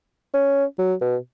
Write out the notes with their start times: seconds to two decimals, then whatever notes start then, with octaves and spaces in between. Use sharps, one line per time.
0.34 C#4
0.78 F#3
1.01 B2